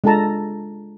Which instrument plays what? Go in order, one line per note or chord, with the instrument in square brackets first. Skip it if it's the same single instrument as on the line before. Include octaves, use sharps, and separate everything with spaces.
[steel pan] G#3 D4 F4 A4 A5 A#5